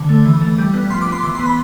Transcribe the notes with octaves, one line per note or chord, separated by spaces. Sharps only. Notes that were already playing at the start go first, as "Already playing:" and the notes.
Already playing: D3
A3
E3
A3
G3
B3
F3 C6
D6
B3 C6
E3 D6
C6
B3
B5